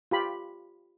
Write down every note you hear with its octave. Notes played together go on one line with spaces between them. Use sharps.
F4 G4 B5